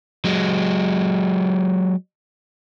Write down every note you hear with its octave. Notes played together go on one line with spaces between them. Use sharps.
F#3 G#3